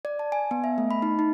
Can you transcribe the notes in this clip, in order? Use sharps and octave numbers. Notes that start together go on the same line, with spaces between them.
D5
A5
G#5
B3
E5
A3
B5
D#4
D#4